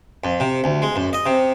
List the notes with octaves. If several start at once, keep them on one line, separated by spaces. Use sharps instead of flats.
F2
C3
D2
G#3
F#2
D#5
C3